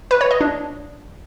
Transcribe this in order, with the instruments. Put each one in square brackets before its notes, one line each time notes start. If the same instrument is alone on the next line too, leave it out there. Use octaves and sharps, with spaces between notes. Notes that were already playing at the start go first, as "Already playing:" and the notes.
[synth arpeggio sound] B4
C#5
D#5
D4